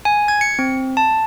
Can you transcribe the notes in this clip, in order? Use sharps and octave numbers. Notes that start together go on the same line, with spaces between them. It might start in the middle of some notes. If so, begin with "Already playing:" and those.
G#5
G#6
C#7
C4
A5